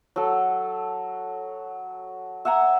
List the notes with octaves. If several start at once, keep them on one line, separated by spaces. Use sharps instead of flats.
F#3 A4
E5 F#5 G#5 A#5